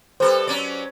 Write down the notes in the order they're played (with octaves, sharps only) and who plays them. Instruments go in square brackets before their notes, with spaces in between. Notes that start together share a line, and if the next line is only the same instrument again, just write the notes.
[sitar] G3 A4 B4 [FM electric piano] C5
[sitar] F#3 C#4 D5